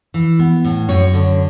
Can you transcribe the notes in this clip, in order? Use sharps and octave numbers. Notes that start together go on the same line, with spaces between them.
E3
B3
A2
F#2 C#5
D3